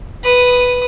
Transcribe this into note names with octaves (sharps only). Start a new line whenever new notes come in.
B4 D#6